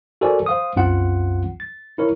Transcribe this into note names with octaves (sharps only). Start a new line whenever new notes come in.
F#4 A4 A#4 C5 D5 G#5
C5 F5 D#6
C2 F#2 C4 F4 F#5
A6
E4 A#4 C#5